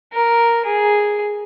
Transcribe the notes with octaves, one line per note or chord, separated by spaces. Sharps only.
A#4
G#4